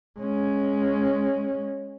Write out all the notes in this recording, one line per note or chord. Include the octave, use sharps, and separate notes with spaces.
G#3 C#4